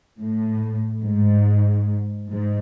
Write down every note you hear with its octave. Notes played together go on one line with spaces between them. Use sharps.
A2
G#2
G#2